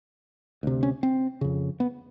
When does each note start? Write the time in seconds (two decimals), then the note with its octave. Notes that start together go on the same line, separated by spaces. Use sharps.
0.63 D2 C3
0.83 C#4
1.03 C4
1.41 F2 C#3
1.80 B3